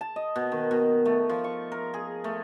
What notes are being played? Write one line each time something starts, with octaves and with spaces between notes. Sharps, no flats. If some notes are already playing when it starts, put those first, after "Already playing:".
A5
D#5
B2
D#3
B2
A3
F3
C#6
A#4
G#4
A3